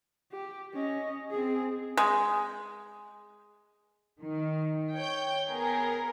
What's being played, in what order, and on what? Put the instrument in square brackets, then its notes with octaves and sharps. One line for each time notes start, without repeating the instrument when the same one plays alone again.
[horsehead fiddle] G4
C#4 D#5
C4 G#4
[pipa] G#3
[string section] D#3
C#5 G5 G6
B3 G#4 A#4